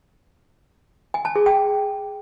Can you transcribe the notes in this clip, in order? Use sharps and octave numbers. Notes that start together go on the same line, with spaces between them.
G#5
A5
G#4
G5